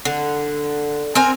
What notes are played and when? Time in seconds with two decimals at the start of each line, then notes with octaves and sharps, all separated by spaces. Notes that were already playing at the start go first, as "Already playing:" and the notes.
0.05 D3
1.15 C4 A#4 G#5